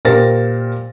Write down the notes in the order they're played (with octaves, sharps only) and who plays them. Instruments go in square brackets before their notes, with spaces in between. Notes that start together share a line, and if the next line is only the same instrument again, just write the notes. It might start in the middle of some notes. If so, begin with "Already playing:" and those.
[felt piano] A#2 G4 A#4 C5 A6 A#6